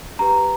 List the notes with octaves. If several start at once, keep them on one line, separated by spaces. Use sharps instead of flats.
D4 G4 B4 A#5